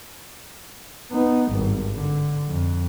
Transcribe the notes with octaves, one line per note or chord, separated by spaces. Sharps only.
B3 D#4
G#1 G2
D3
F2